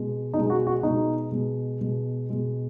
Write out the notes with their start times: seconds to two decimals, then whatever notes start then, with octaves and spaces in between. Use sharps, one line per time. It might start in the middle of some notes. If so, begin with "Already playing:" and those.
Already playing: B2 G#3
0.34 B2 G#3 D#4
0.50 F#4
0.67 F#4
0.83 B2 G#3 D#4
1.31 B2 G#3
1.81 B2 G#3
2.30 B2 G#3